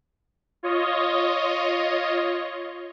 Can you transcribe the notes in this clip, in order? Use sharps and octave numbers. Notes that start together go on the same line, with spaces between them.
F4 C#5 D#5